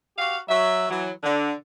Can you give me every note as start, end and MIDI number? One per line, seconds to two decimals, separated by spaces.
0.18 0.38 66
0.18 0.38 67
0.18 0.38 77
0.49 0.88 54
0.49 0.88 76
0.89 1.10 52
0.89 1.10 54
1.23 1.52 50